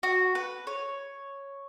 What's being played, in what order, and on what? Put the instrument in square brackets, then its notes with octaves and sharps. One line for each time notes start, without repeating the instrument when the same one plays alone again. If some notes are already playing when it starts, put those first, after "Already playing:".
[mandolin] F#4
B4
C#5